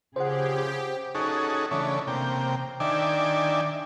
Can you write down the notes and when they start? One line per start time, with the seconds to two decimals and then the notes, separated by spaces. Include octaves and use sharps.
0.16 C#3 F3 G4 G#4 C5 F#5
1.15 C#4 D#4 F#4 G#4 A4
1.71 C#3 E3 A3 C#4 D4
2.07 C3 A#3 G5
2.80 D#3 D4 D5 E5 G5 G#5